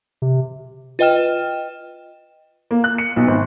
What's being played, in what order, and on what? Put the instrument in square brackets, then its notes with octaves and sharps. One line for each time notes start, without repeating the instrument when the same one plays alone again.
[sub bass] C3
[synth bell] F4 B4 D#5 G5 F6 E7
[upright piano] A#3
F#6
C#7
B1
G#1